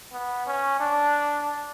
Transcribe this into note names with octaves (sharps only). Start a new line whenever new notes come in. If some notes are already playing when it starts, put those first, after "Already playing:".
B3
C#4
D4